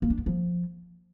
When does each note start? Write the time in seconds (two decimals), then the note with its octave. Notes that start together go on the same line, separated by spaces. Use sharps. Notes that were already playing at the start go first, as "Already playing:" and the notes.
0.02 A#3
0.10 D4
0.18 B3
0.26 F3